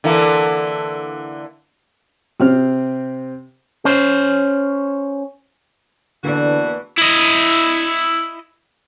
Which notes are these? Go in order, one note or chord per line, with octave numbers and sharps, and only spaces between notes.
D3 E3 A#3
C3 C4 F6
C#4 C5
E2 D3 E3 A#3 D4 F#4
E4 D#5